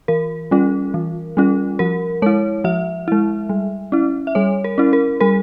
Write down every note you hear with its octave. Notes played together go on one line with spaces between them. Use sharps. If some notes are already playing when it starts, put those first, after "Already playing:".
E3 A#4
G3 C#4 F4
E3
G3 C#4 F4
F3 A#4
G#3 E4 C#5
F3 E5
G#3 E4
G3
C#4 E4
E5
G3 C#5
A#4
C#4 E4
A#4
G3 A#4